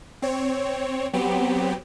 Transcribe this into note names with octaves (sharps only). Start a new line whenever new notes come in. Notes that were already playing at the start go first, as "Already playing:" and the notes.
C4 C#5
F#3 B3 C4 G4